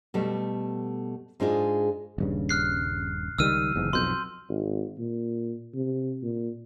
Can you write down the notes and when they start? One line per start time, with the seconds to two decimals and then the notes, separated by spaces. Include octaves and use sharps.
0.14 B2 G3 A3
1.40 G#2 G#3 D4 F4 G#4
2.18 D#1 G2 C#3
2.49 F6 F#6 C7
3.38 C#2 D#3 G3 E6 F6 D#7
3.75 F#1 E2 G#2
3.93 B1 F2 B2 C6 G6
4.49 G#1
4.99 A#2
5.74 C3
6.23 A#2